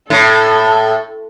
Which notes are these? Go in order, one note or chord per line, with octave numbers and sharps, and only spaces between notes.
A2 A4